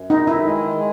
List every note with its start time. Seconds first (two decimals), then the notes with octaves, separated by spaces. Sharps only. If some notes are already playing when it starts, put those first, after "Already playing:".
Already playing: F#2
0.10 D#3 D#4
0.27 E4
0.44 G#3
0.76 G#3